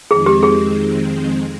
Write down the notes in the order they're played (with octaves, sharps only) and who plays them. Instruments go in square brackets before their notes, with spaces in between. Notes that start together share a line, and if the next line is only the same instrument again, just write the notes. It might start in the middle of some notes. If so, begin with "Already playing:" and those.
[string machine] F2 D#3 G#3 C4 [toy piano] G#4
[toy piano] G4
G#4